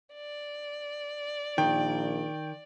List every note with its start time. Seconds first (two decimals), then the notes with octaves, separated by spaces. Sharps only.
0.14 D5
1.58 A#1 D#3 G5